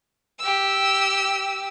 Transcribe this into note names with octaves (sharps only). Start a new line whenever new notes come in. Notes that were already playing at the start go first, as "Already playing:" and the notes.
G4 E6